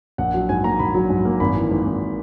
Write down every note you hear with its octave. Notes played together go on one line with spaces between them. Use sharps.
A#1 F#5
F#3
G#2 G#5
A#3 A#5
A#1 B5
F#3
G#2
A#3
G#1 B5
E3
G#2
G#1